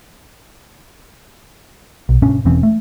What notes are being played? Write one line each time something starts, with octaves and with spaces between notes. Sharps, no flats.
B1
F#1 A#2 C#4 D4
E1 E3 C4 C#4
A3